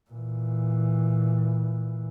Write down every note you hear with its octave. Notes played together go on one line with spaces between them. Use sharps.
A#2 E3